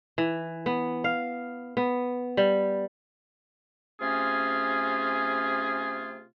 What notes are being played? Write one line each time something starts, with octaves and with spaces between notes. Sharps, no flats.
E3
B3
F5
B3
G3
C3 A3 C#4 F4 G#4